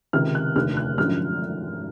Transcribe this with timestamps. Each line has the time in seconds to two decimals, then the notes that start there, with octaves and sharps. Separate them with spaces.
0.13 C#2 C3 D#3 F6
0.35 F#6
0.56 F1 D#2 D3 F6
0.77 F#6
0.98 G#1 F#2 D3 F3 F6